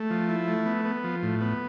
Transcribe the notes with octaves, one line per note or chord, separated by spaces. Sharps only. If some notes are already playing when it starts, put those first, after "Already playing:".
Already playing: A3
F3
E4
A3
B3
B3
F3
A2
B3